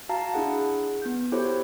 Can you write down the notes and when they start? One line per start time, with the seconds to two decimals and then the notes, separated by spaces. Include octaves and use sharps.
0.09 F#4 F5 A5 A#5
0.34 D4 E4 G#4 F#5
1.02 B3 G6
1.32 E4 F#4 G4 A4 C5 C#5